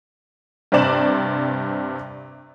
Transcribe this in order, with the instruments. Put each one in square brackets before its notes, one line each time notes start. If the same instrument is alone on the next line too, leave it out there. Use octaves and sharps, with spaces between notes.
[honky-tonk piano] G2 C3 C5 D5 E7 F#7